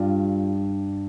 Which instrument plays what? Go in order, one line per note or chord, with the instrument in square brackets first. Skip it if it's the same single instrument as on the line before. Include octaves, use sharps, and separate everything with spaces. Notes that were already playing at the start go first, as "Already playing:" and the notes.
Already playing: [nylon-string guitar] G2 G3 F4